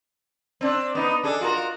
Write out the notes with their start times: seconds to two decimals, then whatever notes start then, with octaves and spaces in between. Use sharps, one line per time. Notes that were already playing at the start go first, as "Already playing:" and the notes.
0.61 C4 D4
0.95 B3 D#4
1.24 D4 G#4 A4
1.41 F4 F#4 A#4